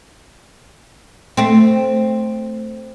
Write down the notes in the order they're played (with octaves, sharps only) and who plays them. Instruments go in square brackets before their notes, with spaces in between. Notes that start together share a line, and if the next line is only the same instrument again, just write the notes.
[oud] A3 C4